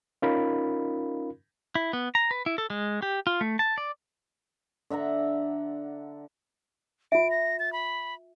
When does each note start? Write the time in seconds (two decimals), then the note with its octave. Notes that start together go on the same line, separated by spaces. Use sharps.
0.22 C#4 D#4 F4 A#4 F5 B5
1.75 E4
1.93 B3
2.15 A#5
2.31 B4
2.46 E4
2.58 A4
2.70 G#3
3.02 G4
3.27 F4
3.41 A3
3.59 A5
3.78 D5
4.90 D3 E5 F#5 A#5
7.12 F4 E5 D7
7.31 A#6
7.60 A6
7.73 B5